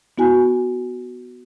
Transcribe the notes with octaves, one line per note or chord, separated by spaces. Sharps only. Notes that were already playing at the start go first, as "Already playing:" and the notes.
B3 E4 F#4 G#5